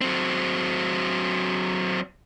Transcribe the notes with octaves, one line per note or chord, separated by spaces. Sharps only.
F#3 C4